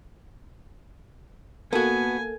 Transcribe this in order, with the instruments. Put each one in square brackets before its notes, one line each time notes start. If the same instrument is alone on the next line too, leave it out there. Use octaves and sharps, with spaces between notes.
[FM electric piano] A#3 A4 [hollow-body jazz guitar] B3 F#4 [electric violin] G#5